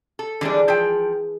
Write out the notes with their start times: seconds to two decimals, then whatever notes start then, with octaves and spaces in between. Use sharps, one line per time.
0.19 A4
0.41 D3 E3 G3 G#3 D4 A#4
0.68 F3 G#4 E5 G5